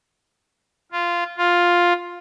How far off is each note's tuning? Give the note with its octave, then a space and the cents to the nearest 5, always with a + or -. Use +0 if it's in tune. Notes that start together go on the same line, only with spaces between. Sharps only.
F4 -10
F4 +5